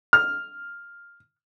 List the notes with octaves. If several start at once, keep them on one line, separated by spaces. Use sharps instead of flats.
F6